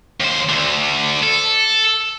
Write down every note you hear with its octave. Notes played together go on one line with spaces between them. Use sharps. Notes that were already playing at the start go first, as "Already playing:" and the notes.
D#2 C5
D2 D3
A4